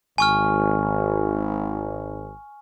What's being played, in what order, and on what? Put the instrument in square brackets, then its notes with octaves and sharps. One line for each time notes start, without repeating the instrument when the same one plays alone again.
[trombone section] G#1 [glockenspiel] G#5 C#6 F6